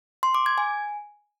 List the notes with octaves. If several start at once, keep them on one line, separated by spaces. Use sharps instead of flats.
C6
D6
G#6
G#5